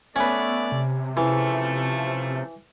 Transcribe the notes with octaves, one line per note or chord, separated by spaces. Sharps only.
A3 B3 C#4 B4 D5
C3
C#3 E3 F3 A3